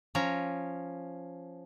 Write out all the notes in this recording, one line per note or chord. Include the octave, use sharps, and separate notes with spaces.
F3 C#4 A#5